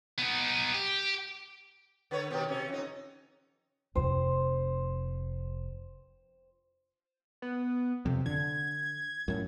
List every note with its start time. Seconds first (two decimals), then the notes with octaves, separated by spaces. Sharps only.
0.18 B3 D#4
0.73 G4
2.11 D3 B4 C#5
2.31 B2 D#3 G4
2.49 C3 C#4
2.68 F2 D#4
3.95 F1 F2 C5
7.42 B3
8.06 F2 C3
8.26 D3 G#6
9.28 F#2 A2